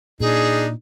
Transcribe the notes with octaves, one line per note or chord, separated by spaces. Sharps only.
A#2 D4 D#4 G#4